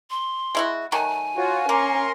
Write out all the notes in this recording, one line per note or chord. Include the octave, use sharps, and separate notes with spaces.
C6
G#3 E4 F#4
D#3 F#3 A3 G#5
F4 F#4 C#5
A#3 C#4 A#4 C6 C#6